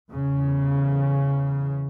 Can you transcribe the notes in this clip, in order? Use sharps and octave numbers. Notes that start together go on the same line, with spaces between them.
E2 C#3